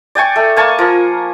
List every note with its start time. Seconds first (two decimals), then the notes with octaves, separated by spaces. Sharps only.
0.15 D5 G5 G#5 C#6
0.36 A3
0.56 A#3 G#5 A5 C#6
0.78 F3 A#4